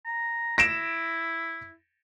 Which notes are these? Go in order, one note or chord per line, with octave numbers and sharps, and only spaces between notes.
A#5
E4 A#6 D7 E7